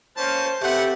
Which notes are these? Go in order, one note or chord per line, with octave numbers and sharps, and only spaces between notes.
A#3 C#4 C5 A5
A3 C4 G4 B4 F#5